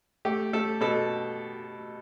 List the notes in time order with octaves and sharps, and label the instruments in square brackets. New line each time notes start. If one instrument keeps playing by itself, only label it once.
[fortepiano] A3 G4
A3 A4
B2 A4